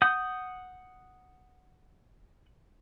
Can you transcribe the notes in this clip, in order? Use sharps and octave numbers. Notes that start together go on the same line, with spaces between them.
F#5 D#6 G6